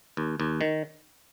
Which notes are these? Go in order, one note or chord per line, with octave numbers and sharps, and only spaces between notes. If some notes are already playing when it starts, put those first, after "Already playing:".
D#2
D#2
D#3